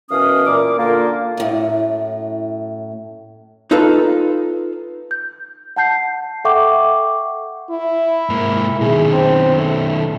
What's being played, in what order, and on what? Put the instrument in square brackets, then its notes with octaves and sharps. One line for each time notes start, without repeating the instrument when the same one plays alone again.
[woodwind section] F#2 B2 E3 C#4 F5 D#6
A#2 D6
D3 A#3 F4
[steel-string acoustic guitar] F#2 A2
[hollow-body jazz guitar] D#4 F4 A4 B4
[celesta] G6
F#5 A5 G6 C7
A4 E5 F#5 G5 C#6 D6
[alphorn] E4
[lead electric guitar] G#2 A#3
[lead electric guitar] B2 D#3 [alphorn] G#4
[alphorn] C4
A3